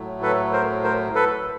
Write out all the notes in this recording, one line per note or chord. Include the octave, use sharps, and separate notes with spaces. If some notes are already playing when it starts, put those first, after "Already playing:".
Already playing: A2 F#3 A3
A4 B4
A#4 C5
A#4 C5
A4 B4